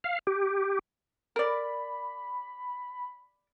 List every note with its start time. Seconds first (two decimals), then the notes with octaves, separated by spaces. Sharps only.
0.04 F5
0.27 G4
1.36 A#4 D5 B5